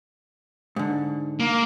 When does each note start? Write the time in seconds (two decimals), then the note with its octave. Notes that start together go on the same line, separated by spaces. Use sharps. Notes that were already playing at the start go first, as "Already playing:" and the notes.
0.76 G#2 D3
1.40 A#3